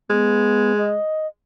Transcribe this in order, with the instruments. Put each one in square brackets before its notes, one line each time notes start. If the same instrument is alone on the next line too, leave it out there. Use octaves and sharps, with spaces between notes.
[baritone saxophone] G#3 [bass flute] B3
[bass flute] D#5